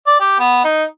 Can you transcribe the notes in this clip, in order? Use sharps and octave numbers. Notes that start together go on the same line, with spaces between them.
D5
G4
B3
D#4